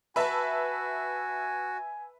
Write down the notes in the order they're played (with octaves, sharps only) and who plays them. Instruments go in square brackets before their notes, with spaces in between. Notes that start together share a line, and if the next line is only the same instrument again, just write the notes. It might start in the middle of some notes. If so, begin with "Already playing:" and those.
[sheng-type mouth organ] F#4 [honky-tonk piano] B4 E5 A5 [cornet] G#5